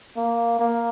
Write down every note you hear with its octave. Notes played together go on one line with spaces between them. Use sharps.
A#3
A#3